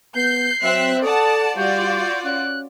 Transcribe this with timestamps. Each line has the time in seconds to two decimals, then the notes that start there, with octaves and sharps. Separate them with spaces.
0.16 B3 G6 C7
0.63 F#3 C4 E5 F#6
1.03 A4 D5 F#5 A5 D#6
1.57 G3 F4 F#4 D5 G6
2.25 C#4 F#6